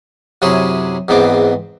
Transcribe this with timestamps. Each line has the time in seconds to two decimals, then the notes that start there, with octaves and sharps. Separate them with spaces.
0.42 F#2 C3 C#4 E4 G#4
1.08 E2 G#2 B3 C4 D6